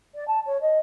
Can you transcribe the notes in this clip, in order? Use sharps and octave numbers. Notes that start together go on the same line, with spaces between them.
D5
A5
C#5
D#5